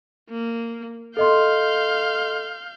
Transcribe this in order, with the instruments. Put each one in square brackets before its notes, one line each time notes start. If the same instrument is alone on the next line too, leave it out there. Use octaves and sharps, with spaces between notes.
[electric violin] A#3
[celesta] A4 D#5 C6 [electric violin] F5 G6